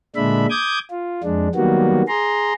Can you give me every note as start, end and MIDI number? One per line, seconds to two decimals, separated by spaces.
0.16 0.46 46
0.16 0.46 50
0.16 0.46 56
0.16 0.46 62
0.16 0.46 76
0.16 0.46 83
0.50 0.79 86
0.50 0.79 87
0.50 0.79 91
0.50 0.79 92
0.91 1.22 65
1.24 1.48 41
1.24 1.48 56
1.24 1.48 62
1.55 2.02 51
1.55 2.02 54
1.55 2.02 55
1.55 2.02 58
1.55 2.02 59
1.55 2.02 66
2.08 2.53 68
2.08 2.53 82
2.08 2.53 84